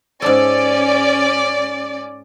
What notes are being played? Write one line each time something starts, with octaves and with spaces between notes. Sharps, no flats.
G#2 C#4 A4 D5